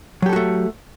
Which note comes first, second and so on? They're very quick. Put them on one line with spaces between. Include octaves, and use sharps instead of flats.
F#3 G4 A4 F#4 A3